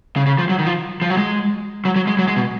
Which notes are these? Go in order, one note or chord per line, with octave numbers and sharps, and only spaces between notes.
C#3
C#3
F3
F#3
D#3
F3
F3
F#3
G#3
F#3
F#3
G#3
F#3
G#3
B2